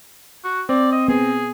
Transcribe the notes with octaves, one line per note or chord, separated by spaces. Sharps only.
F#4
C4 D5
D#5
B3 G#4